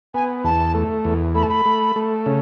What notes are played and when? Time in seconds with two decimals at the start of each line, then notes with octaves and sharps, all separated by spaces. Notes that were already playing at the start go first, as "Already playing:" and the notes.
0.14 B3 G#5
0.44 E2 A5
0.74 A3
1.05 E2
1.35 A3 B5
1.43 A5
1.49 B5
1.66 A3
1.96 A3
2.26 C#3